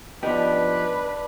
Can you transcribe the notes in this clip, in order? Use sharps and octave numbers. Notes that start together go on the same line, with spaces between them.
F3 B3 D4 D#4 G4 B4